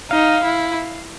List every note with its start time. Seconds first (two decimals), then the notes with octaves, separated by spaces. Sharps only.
0.11 D#4 F5
0.44 E4